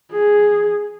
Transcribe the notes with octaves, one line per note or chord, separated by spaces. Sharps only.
G#4